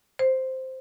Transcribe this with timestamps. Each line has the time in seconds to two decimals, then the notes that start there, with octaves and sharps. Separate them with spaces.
0.19 C5